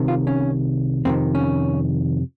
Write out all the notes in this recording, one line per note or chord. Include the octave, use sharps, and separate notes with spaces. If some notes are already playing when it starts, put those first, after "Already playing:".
Already playing: C2 C3 D#3
F4
C#4
F2 C3 D#3 C4
C#4